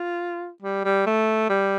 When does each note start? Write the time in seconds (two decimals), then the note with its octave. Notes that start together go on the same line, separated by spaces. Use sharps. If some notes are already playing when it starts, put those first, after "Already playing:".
Already playing: F4
0.63 G3
0.85 G3
1.06 A3
1.50 G3